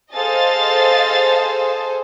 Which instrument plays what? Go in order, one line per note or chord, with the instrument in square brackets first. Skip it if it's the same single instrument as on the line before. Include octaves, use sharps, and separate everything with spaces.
[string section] G#4 A4 C5 [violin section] D#5 F5 A6